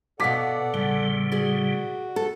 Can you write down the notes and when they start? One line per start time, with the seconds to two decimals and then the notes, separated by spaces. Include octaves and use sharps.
0.20 B2 A4 D5 D#5 F5 F#5 D6 B6
0.74 E2 A2 C#3 G3
1.32 F#4 G#4 D5
2.16 A4